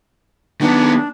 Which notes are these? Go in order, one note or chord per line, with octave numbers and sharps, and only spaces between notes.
D#3 B3 D4